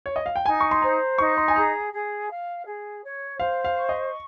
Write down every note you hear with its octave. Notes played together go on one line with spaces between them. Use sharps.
C#5
D#5
F5
G5
D#4 G#5
C#6
C6
C5 A#5
D#4 C#6
C6
G#5
G#4 A#5
G#4
F5
G#4
C#5
C5 F5
F5
C#6
D#5